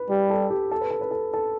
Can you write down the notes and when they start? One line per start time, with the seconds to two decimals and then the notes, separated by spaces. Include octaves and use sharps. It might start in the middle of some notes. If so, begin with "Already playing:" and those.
Already playing: B4
0.09 G3 G4
0.30 A4
0.50 G4
0.71 A4
0.81 B4
0.91 A4
1.01 B4
1.11 A4
1.33 A4